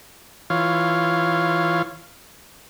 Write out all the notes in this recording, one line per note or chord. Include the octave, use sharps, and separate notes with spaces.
E3 F4 C#5 F5